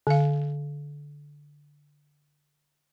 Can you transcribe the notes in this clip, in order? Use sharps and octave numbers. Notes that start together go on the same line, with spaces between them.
D3 F5